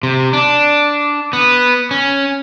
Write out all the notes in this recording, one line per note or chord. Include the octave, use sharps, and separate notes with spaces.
C3
D4
B3
C#4